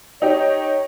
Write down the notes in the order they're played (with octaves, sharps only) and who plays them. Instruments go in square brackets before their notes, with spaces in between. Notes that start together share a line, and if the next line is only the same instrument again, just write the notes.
[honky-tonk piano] D#4 G4 [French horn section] C#5